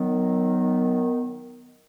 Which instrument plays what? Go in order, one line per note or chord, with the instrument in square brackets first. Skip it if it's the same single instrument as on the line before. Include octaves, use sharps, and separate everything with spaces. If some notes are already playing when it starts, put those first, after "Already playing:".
Already playing: [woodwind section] D#3 F#3 B3